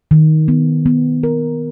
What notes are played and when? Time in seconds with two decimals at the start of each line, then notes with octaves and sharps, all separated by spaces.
0.11 D#3
0.48 B3
0.86 B3
1.23 A#4